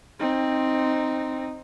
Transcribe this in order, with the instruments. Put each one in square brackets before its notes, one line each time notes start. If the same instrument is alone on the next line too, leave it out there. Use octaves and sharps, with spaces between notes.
[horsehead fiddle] C4 D#4